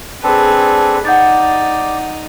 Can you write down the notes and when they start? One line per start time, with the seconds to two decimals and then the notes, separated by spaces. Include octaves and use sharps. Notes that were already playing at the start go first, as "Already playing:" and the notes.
0.23 C4 D4 G#4 A4 B4
1.05 D#4 D5 F#5 G6 A6